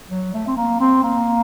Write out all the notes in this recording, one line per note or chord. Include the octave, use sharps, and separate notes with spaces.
F#3
A3
C4
A#3
C4
A#3